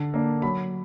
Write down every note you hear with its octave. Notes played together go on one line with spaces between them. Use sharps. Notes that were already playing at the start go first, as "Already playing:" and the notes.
Already playing: D3
A#3 D4
F#3 B5